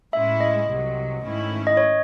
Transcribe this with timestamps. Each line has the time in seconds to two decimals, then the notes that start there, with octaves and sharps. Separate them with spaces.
0.13 A2 G#3 C#4 E4 E5
0.40 D#5
0.69 C2 C3 F#3
1.23 G#2 D#3 A3 C#4 E4
1.67 D#5
1.77 C#5